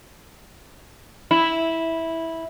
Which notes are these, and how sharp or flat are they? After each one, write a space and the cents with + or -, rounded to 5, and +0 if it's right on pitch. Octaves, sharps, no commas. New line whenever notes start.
E4 -10